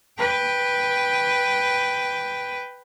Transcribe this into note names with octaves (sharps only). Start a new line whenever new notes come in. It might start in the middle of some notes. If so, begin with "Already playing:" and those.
B4 G5